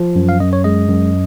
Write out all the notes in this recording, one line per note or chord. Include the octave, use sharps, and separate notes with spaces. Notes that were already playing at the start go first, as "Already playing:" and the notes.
Already playing: F3
F#2
F5
F#2 D#5
C#5
G#3 D#5
F#2